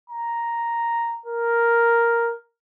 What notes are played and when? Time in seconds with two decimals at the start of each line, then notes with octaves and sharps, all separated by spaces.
0.10 A#5
1.26 A#4